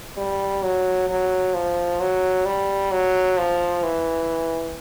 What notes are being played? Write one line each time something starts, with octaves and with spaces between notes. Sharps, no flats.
G3
F#3
F#3
F3
F#3
G3
F#3
F3
E3